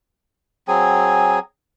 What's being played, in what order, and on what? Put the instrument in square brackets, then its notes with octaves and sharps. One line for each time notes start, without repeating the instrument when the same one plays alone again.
[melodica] F#3 C4 G#4 G#5